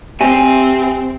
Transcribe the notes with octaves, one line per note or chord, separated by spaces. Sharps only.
C4 G4 E5 G#5